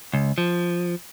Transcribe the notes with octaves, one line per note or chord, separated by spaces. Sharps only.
C#2
F3